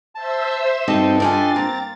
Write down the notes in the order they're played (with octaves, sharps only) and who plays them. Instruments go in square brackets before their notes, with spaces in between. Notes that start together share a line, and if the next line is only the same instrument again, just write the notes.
[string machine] C5 E5 E6 [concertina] A5
[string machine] G2 [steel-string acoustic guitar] C4 D#4 F#4 [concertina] G4 A4 D#5
[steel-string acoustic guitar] D4 F4 G#5 [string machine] A6
[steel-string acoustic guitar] A#3 [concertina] C4 A#5